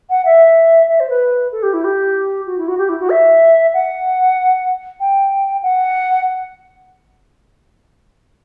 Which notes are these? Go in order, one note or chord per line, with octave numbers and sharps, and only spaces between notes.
F#5
E5
E5
C5
B4
A4
G4
E4
G4
F#4
E4
F#4
G4
E4
F#4
E5
F#5
G5
F#5